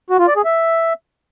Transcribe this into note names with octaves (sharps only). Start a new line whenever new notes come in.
F#4
F4
D5
G#4
E5